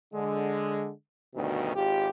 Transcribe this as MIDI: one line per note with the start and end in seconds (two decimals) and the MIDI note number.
0.14 0.91 50
0.14 0.91 56
1.36 1.73 38
1.36 1.73 43
1.36 1.73 47
1.36 1.73 51
1.76 2.09 32
1.76 2.09 65
1.76 2.09 67